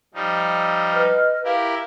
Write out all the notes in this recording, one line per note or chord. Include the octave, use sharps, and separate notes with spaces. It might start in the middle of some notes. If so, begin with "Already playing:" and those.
F3 G3 D#4
E6
B4 D#5 F6
E4 G4 A#4 F5